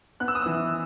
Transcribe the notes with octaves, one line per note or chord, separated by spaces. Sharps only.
B3 F#6
E6
D#6
E3 E6